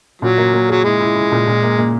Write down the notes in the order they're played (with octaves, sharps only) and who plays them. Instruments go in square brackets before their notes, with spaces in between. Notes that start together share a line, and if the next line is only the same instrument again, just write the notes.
[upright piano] A#2 [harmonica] F#3
[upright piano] A#3
A#3
[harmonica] F#3 [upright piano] G#4
[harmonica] G#3 [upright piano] E4
[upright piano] E4
E4
A#2
A#2
A#3
A#3